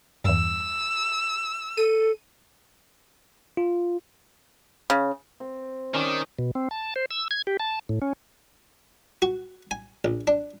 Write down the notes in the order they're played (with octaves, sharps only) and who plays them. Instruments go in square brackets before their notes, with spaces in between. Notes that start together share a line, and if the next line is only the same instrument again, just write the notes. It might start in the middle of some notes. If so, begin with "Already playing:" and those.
[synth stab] E2 G2 [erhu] E6
[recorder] A4 [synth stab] D#7
[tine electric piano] F4
[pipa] C#3
[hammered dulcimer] C4
[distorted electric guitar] D#3 [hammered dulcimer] G3 C#4
[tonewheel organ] B2
C4
A5
C5
E6
G#6
G4
A5
A2
C#4
[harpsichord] F#4
G#5
A#1
D4